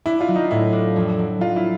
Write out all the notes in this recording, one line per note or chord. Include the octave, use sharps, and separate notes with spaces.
D4 E4
F4
F#3
D#4
A2 E4
D4
F2
F#3
F#3 F4
E4